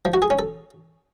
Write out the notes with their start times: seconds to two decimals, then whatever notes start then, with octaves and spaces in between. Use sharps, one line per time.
0.05 F3
0.14 F#4
0.22 G#4
0.30 C#4
0.39 A4